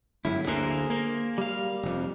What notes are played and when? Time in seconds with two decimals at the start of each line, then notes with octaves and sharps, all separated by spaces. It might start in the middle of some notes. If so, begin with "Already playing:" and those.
0.25 G1 F#2 A2 E4
0.47 D2 D3 A#3 G#4 A#4 C5
0.90 A#3
1.38 G3 F5
1.83 F1 F2